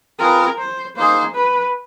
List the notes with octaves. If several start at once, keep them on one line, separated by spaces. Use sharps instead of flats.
C4 F4 G#4 A#4 B4
C5
A#3 D#4 G#4 C5
B4